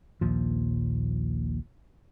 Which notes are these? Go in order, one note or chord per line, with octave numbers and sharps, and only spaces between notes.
A#1 D#2 A#2 F3